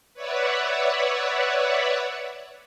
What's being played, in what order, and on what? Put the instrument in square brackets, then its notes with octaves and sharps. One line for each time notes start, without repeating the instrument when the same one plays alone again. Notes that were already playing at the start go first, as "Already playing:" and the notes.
[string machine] B4 C#5 D5 E5 F#5